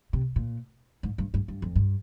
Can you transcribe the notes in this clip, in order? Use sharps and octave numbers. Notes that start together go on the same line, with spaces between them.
C3
A#2
G#2
G2
G2
G2
F2
G2